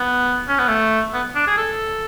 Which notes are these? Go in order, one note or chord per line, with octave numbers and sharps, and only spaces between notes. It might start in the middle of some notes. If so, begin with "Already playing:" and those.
Already playing: B3
C#4
B3
A3
B3
D4
G#4
A4